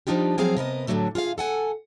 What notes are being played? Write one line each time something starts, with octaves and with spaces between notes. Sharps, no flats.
F3 G3 D4 D#4 F4 G4
F3 F#3 C4 G#4 F5 A#5
C3 B3 A#4 D#5
A2 D3 F3 F#3 A3 D4
F4 G#4 B4 F5
A4 F#5 G#5